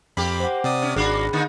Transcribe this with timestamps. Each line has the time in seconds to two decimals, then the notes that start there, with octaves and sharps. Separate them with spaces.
0.17 F2 A#3 G4 B5
0.40 C5 F#5
0.64 C3 D5 D#6
0.82 C#4
0.96 G#1 A#3 D4 F#4 G#4 B5
1.33 D3 A#3 D#4